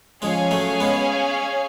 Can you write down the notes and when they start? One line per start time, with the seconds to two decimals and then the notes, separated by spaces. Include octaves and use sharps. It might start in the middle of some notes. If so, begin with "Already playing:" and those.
0.22 F3 G#3 C#4 G#4 C#5 F5 G#5
0.51 F#3 A3
0.80 G#3 B3